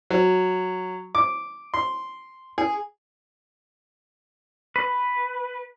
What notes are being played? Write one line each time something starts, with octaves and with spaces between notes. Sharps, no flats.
F#3
D6
C6
G#4
B4